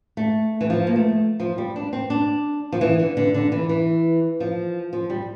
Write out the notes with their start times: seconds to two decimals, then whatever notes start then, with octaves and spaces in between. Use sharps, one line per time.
0.17 A3
0.61 E3
0.70 F3
0.87 A#3
0.96 A3
1.40 F3
1.58 G3
1.76 D4
1.93 C4
2.10 D4
2.72 F3
2.81 E3
2.99 D3
3.17 D3
3.34 D3
3.52 E3
3.69 E3
4.40 F3
4.93 F3
5.10 G3